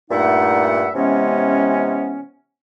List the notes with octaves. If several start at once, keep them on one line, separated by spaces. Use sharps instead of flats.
G2 A#2 A3 D#4 E5 F#5
C3 E3 G#3 B3 C#4